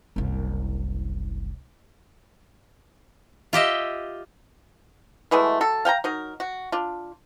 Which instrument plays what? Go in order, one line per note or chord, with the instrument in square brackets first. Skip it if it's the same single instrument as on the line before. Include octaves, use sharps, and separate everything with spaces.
[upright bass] F#1 C2
[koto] F4 G4 D#5 E5
[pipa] B2 E3 G#3 A3
F#3 A4
F5 G5 G#5 A#5
F#3 D#4 A#4
F#4
D4 F4